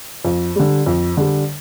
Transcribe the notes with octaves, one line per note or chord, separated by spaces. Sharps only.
F2
D3 G3
F2
D3 G3